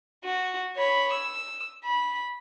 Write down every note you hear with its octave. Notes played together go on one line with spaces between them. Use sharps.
F#4
C#5 B5
E6
B5